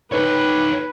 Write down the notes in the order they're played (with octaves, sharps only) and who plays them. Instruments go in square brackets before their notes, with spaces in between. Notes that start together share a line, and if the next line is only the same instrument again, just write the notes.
[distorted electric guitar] D#4 C#5 [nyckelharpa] B4